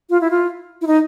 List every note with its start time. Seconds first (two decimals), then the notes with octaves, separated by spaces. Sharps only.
0.10 F4
0.21 E4
0.30 F4
0.81 E4
0.87 D#4